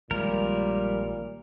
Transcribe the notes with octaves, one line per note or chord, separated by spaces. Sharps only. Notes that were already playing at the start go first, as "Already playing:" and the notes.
A#1 A#2 D#3 G3 G#3 A#4